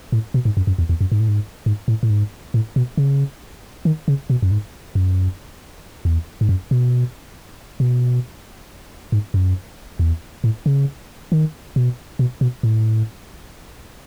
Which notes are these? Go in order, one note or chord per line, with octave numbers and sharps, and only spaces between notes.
A2
B2
G#2
F#2
F#2
E2
E2
F#2
G#2
A2
G#2
G#2
A2
A2
G#2
A2
B2
C#3
D#3
C#3
B2
F#2
G#2
F#2
E2
G#2
F#2
B2
B2
G#2
F#2
E2
A2
C#3
D#3
B2
B2
B2
A2